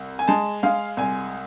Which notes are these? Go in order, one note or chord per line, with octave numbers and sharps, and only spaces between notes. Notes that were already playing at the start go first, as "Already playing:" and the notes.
Already playing: C2
G#5
G#3 A5
G#3 F5
C2 G#5